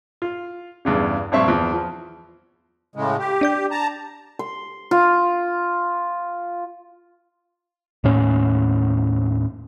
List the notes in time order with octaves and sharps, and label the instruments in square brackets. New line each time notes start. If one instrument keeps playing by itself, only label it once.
[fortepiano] F4
E2 G2 C#3
A#1 G2 C4 E5 C#6
E2 F3
F3
[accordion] A2 C#3 G#3
G4
[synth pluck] D4 D5 G6
[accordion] A5 A#5
[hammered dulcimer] C6
F4
[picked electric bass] D#2 A2 C#4